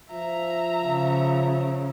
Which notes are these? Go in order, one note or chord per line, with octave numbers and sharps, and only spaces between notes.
F3 E5 A#5
C#3